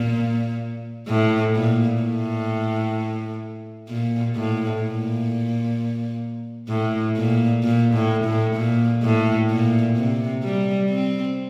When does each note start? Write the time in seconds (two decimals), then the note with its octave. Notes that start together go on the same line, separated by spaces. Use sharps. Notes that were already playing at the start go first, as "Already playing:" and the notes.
Already playing: A#2
1.08 A2
1.55 A#2
2.02 A2
3.89 A#2
4.35 A2
4.82 A#2
6.69 A2
7.16 A#2
7.63 A#2
7.94 A2
8.25 A2
8.56 A#2
9.03 A2
9.50 A#2
9.97 C3
10.43 G3
10.90 C4